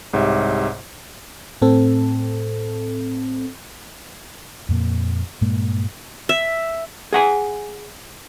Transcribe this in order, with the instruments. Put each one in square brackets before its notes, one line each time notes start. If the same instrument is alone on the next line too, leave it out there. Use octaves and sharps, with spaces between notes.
[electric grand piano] C2 G#2 G4 C#5 E5
[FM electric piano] A2 C4 A4
[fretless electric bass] F2 A#2 A#3
G2 A#2 G#3 A#3
[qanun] E5
[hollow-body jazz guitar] G#4 F#5 G#5